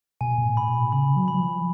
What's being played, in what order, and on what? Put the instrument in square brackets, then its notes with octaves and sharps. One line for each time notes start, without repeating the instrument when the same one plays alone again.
[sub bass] B2 [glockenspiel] G#5
[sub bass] B2
A2
[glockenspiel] B5
[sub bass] B2
[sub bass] C#3 [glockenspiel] B5
[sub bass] F#3
[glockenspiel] B5
[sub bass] F#3
F3